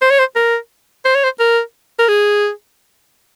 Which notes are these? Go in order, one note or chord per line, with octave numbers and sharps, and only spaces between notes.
C5
C#5
C5
A#4
C5
C#5
C5
A#4
A#4
G#4